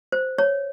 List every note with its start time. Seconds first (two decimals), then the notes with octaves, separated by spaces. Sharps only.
0.12 C5
0.38 C#5